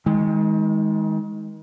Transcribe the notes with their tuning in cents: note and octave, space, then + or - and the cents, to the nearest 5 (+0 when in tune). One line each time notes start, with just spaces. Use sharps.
D#3 +35 G#3 +0